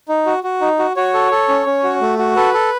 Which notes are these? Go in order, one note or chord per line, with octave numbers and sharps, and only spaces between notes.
D#4
F#4
F#4
D#4
F#4
F#4 C#5
A4
A4
C#4
C#4
F#4
A3
F#4
A4 B4
A4